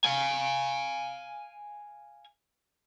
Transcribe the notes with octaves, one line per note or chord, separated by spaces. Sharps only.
F5 G#5